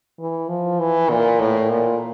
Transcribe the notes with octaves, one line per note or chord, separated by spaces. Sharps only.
E3
F3
E3
A#2
A2
A#2